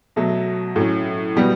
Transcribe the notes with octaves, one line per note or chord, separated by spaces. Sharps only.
B2 F#3 A3
A2 F#3 C#4
B2 G3 B3 F#4